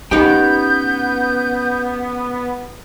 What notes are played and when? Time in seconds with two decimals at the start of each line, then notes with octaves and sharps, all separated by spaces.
0.11 B3 C#4 D#4 G4 G5 G6